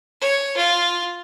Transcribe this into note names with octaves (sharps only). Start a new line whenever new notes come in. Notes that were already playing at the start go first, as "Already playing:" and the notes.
C#5
F4